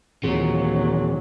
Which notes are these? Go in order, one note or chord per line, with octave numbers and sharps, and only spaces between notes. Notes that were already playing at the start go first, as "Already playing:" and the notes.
D#2 A#2 E3 F#3 C4 G#4